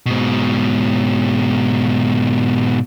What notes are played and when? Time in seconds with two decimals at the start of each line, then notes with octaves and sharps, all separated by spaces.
0.06 G#2 B2